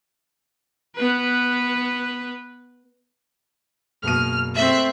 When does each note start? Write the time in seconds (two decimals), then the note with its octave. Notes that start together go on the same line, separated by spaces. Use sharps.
0.96 B3 B4
4.03 F#1 B2 F6 D#7
4.55 A3 C4 E5 F#6